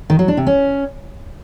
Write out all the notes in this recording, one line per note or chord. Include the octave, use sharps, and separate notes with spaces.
D#3
F#3
D4
C3
C#4